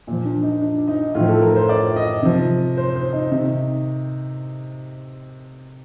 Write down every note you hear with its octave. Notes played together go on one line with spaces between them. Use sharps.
A#2 F3
D4
D#4
D4
D#4
A2 F3 F4
A4
A#4
C5
D5
D#5
C3 F3
C5
C5
D#4
C3 D#3